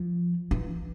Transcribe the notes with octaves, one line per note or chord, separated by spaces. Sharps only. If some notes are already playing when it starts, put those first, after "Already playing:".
Already playing: F3
E3